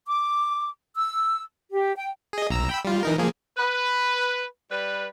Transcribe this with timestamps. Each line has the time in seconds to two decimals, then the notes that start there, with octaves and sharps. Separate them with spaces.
0.06 D6
0.94 E6
1.71 G4
1.96 G5
2.33 G#4 D#5
2.50 B1 A#5 E6
2.69 G5 B5 E6
2.85 G3 F4
3.03 E3 D#4 A#4
3.18 F3 A#3 G#4
3.57 B4
4.69 G3 B4